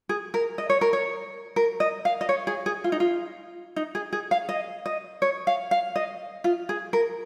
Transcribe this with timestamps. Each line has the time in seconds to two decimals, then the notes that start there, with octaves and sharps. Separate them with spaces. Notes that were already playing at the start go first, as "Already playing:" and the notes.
0.09 G#4
0.34 A#4
0.58 D#5
0.70 C#5
0.81 A#4
0.93 C#5
1.56 A#4
1.80 D#5
2.05 F5
2.21 D#5
2.29 C#5
2.47 G#4
2.66 G#4
2.84 F4
2.92 D#4
3.00 F4
3.76 D#4
3.95 G#4
4.13 G#4
4.31 F5
4.49 D#5
4.86 D#5
5.22 C#5
5.47 F5
5.71 F5
5.96 D#5
6.44 F4
6.69 G#4
6.93 A#4